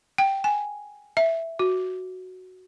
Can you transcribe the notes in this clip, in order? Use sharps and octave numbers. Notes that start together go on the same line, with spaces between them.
G5
G#5
E5
F#4